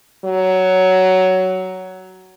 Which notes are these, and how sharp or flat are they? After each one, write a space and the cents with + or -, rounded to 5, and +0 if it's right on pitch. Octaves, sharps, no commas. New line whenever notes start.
F#3 +10